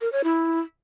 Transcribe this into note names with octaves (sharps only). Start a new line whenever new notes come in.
A#4
C#5
E4